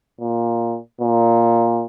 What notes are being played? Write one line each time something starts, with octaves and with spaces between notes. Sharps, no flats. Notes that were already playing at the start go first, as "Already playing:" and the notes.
A#2
A#2